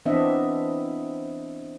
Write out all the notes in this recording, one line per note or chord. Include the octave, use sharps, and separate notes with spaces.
E3 B3 C4 D4 D#5 E5